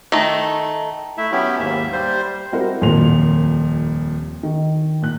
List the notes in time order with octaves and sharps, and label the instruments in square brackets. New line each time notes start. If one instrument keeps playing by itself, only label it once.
[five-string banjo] D#3 A3
[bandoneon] A3 E4 E5
F#3 B3 C#4 E4 G4
D#2 G#2 A#3 E5
G3 C5
[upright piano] G3 C4 E4 F#4 A#4 C5
D#1 F2 A#2 A#4 C6 F7
D#3
A#2 F#6